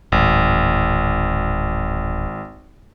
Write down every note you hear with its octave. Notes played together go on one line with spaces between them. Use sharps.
D1 G#1